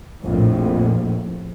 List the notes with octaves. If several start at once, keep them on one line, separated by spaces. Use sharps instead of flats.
A#1 F2 A2